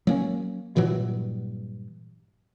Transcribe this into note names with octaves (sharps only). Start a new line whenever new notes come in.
F#3 A#3 C#4
G2 A#2 E3 F#3